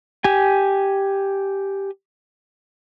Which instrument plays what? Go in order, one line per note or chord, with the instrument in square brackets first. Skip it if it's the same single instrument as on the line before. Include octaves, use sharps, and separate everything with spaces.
[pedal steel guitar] G4 G#5